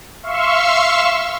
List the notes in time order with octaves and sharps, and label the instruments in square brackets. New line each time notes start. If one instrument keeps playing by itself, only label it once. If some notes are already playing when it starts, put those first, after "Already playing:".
[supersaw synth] E5 F5 C6 C#6 E6